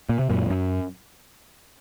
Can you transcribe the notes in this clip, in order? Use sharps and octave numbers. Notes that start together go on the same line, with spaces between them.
A#2
C3
F#2 A#2
F2
F#2